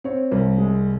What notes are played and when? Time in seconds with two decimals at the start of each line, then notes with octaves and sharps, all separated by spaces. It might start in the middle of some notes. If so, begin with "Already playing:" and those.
0.04 C4 C#5
0.31 C2
0.58 G#3